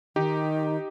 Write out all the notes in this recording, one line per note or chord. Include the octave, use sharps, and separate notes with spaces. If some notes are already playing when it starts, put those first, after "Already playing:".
D#3 D#4 G4